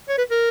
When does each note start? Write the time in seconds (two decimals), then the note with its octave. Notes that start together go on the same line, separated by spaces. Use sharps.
0.09 C#5
0.18 B4
0.31 A#4